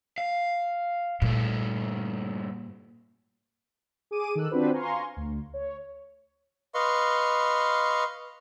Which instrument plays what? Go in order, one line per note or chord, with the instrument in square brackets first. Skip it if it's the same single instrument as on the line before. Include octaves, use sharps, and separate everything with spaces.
[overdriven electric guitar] F5
[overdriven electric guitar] G2 A3 [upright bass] A#2
[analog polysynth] G#4 D6 D#7
D#3 A4 E6 F#6
C4 D4 F4 F#4 B4 C5
F5 G#5 A#5 C6 C#6
D2
C#5
[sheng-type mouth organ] B4 D#5 F5 C6 C#6